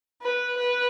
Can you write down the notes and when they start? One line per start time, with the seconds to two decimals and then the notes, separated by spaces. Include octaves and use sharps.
0.22 B4
0.58 B4